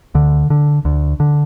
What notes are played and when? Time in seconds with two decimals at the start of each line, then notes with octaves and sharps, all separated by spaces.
0.15 D2 D3
0.50 D3
0.85 D2
1.20 D3